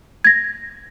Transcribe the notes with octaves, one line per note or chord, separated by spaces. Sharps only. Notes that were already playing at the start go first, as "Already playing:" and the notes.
G#6 A#6